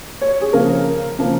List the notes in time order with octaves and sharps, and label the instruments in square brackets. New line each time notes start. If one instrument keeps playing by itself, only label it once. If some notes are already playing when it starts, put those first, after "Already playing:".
[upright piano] C#5
G#4
C#3 F3 A#3 A#4
C#3 F3 A#3